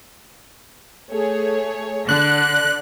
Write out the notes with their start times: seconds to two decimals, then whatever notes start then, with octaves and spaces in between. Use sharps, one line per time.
1.11 A3 G#4 C#5
2.09 D3 D5 F#6